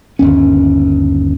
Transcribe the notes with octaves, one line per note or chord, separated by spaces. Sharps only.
G1 D#2 C#4